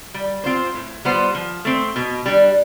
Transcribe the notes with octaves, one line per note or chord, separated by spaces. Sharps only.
G3
C4 F4 C5
A2
G3 B3 F4 C5
F3
A3 C4
B2
G3 D4